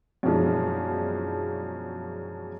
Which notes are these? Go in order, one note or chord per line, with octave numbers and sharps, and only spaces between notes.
F#2 B2 E3 F3 G#3 D4